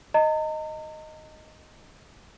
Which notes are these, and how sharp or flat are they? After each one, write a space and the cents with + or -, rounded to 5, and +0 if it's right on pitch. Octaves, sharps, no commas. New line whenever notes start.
D#5 +0 A#5 -40